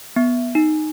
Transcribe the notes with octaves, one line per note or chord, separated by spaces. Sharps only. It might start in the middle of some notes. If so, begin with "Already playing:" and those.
B3
D#4